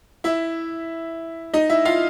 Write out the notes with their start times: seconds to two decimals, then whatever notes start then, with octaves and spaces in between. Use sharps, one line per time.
0.24 E4 E5
1.54 D#4 D#5
1.70 E4 E5
1.85 F4 F5